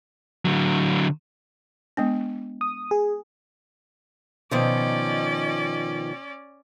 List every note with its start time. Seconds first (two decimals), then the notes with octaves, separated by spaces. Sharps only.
0.45 D3 F#3
1.97 G#3 B3 D4
2.61 D#6
2.91 G#4
4.51 B2 D#3 F3 C#4 D5